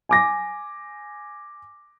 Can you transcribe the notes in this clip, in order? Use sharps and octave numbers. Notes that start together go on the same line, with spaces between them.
G#5 D6 A#6